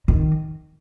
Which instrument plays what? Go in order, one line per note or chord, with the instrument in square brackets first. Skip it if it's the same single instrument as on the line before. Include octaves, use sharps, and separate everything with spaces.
[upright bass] D#3